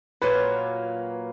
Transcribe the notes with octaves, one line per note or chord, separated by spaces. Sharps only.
A#2 F#3 A#3 F4 B4